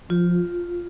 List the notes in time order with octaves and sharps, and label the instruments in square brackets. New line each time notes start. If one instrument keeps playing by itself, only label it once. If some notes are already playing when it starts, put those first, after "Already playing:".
[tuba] F3 [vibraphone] F4